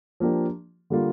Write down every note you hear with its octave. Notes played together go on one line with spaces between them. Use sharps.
F3 A#3 D4 G4
D3 G3 A#3 F4